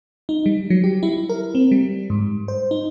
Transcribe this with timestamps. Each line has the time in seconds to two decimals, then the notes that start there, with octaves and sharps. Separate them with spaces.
0.29 D#4
0.46 G3
0.70 F#3
0.84 G4
1.03 E4
1.29 A#4
1.55 C4
1.72 G3
2.10 G#2
2.48 C5
2.71 D#4